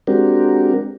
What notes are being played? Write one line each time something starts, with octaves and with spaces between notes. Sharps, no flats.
G#3 C4 D4 F#4 G4 A#4